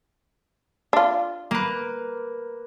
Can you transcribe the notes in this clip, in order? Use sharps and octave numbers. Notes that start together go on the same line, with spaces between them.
D4 F4
A#3 B4